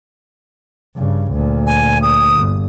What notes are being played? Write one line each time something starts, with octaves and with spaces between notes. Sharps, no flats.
G2 C#3
D2 A#2
G#5
D#6
G1